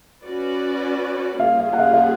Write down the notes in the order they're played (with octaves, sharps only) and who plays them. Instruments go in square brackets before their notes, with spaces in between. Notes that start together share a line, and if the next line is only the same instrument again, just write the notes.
[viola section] C#4 F#4 B4 D5
[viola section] G3 A#3 C#4 F4 G#4 [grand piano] F5
[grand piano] F5
F#5
F5
F5
F#5